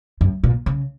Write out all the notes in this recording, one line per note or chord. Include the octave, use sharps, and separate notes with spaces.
F#2
A#2
C#3